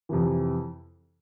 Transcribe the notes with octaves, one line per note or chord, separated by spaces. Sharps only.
F2 C3 E3